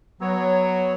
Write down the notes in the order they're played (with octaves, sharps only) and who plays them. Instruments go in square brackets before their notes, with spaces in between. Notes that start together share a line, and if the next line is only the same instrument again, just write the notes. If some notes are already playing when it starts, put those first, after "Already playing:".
[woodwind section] F#3 [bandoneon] B3 C#5